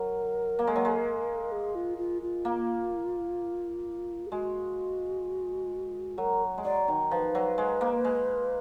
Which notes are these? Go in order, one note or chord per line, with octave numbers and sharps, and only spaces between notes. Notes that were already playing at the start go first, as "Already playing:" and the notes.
Already playing: F#3 A#4
A#3
G#3
F#3
G#3
G#4
F4
F4
F4
A#3
G#4
G#3 F#4
F#3 A#4
G#3
F#3 D5
D#3
F3 B4
F#3
G#3
A#3
G#3